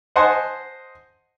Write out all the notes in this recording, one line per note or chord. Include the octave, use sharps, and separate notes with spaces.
C5 D#5 F#5 G#5 A5 C6